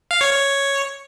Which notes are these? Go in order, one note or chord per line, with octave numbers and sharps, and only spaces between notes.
F5
C#5
C#5